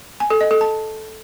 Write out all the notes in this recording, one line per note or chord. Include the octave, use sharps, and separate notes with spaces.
G#5
A4
D#5
A4
A5